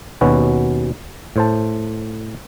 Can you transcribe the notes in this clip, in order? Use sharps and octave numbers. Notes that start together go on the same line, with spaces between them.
D#2 B2 C#4 F#4 B4
A2 C5 A5